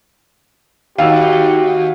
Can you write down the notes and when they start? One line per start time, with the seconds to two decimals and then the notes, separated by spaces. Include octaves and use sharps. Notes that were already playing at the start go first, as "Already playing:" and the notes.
0.98 D#2 F#4 G4 F5 E6